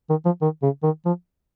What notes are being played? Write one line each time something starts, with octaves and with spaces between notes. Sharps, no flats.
D#3
F3
D#3
C#3
D#3
F3